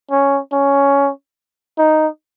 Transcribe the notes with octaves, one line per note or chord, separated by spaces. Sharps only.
C#4
C#4
D#4